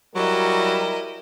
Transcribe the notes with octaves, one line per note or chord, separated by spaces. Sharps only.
F#3 G3 E4 A#4 D#5